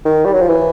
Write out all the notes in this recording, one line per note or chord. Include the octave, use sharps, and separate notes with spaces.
D#3
G3
F#3
F3
E3